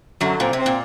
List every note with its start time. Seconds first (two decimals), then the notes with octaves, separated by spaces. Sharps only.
0.21 F#2 D3 F#3
0.39 A#2 C4
0.53 C3
0.59 C4
0.66 A#2